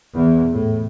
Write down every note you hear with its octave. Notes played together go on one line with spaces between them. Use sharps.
E2
A2